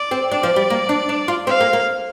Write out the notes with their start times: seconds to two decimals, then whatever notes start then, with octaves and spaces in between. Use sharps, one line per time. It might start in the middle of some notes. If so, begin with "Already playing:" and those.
Already playing: D5
0.11 C4
0.31 D4 D5
0.43 F3
0.56 G3
0.70 A#3
0.89 D4
1.09 D4
1.28 F4
1.47 C4 F5
1.61 A#3
1.73 A#3